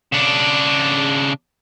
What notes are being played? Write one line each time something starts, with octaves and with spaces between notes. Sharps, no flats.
C#3 D4